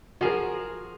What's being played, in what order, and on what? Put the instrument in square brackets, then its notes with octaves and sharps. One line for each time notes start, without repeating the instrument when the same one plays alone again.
[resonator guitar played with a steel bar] F3 G#4 [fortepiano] F#4 A#4